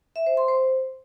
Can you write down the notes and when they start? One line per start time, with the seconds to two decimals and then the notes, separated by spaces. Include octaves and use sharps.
0.16 E5
0.26 C5
0.37 C6
0.48 C5